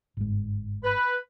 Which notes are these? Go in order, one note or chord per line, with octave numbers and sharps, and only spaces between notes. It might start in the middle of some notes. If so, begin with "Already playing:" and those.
G1 G#2
B4